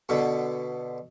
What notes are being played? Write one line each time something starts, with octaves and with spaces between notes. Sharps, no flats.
B2 D3